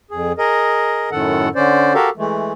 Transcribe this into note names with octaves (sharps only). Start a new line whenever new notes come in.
F2 G#4
G#4 A#4 D#5
F#2 A2 D#3 A4 F#5
D3 C#4 C5 D5
F#4 G4 A4 A#4 F5
E3 G#3 A3